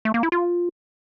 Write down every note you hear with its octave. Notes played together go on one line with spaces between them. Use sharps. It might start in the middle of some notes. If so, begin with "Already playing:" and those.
A3
A#3
E4
F4